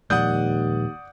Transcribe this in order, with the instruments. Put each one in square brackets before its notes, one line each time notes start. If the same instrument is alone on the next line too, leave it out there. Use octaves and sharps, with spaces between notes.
[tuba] D#2 [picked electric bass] A#2 F3 G#3 [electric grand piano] D5 F#5 [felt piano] D#6 G6